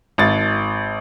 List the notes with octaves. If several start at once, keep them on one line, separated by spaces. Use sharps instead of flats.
G#1 A6